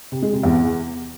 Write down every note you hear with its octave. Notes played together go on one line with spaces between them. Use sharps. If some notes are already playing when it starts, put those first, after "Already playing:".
C3
G#3
C3
E2